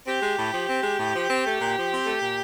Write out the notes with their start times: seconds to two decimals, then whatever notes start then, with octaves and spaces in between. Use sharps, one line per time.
0.07 C4 G4
0.22 G#3
0.37 A2
0.53 F3
0.69 C4
0.83 G#3
0.99 A2
1.15 F3
1.30 C4
1.45 A3
1.61 A#2
1.76 F3
1.91 C4
2.06 A3
2.22 A#2